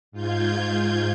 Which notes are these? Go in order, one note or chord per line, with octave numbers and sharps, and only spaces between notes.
G#2 F4 G6 G#6